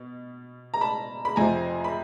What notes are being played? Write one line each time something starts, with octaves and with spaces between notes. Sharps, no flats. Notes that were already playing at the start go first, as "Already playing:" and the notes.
Already playing: B2
A#5
A5 B5
B5
F2 C3 F3 G#5 A#5
B5